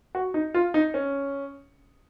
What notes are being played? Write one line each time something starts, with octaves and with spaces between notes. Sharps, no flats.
F#4
D#4
F4
D#4
C#4